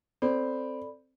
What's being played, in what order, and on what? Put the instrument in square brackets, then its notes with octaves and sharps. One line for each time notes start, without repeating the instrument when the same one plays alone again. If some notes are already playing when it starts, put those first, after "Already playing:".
[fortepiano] C4 [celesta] A4 D5 B5